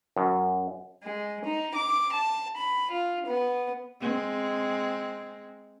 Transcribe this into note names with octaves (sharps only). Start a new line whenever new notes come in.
F#2
G#3
D#4
D6
A5
B5
F4
B3
G#3 C4